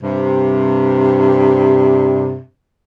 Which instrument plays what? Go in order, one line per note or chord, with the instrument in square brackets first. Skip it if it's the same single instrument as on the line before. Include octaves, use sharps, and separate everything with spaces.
[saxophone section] G2 C3